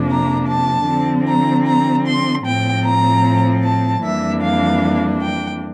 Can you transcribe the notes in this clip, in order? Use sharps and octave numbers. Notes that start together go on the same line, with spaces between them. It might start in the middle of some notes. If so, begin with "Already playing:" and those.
Already playing: F2 C3 F3 A#3 D4
A#5
A5
D3 F3 C4
A#5
A#5
C6
A2 F3 C4 G5
A#5
A5
F2 E3 G3 A#3 D4 E5
F5
G5